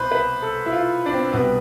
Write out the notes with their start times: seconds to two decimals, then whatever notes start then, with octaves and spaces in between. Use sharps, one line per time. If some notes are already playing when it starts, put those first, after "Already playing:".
Already playing: C2 B2 B4 C5
0.12 B4
0.42 A4
0.66 E4
0.72 F4
1.06 D4
1.13 C4
1.32 C2 B2 G3 B3